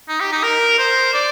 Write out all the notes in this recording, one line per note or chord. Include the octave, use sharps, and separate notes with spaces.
D#4
G4
D#4
A#4
C5
D5